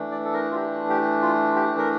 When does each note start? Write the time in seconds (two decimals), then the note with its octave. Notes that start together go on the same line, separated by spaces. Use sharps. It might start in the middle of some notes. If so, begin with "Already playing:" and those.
Already playing: E3 A3 D4
0.12 D5
0.25 A4
0.34 A#4
0.51 F4
0.56 G4
0.90 G4
1.22 F4
1.56 G4
1.78 A#4